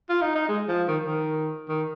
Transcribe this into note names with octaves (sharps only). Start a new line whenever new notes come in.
F4
D#4
D#4
G#3
F3
D#3
D#3
D#3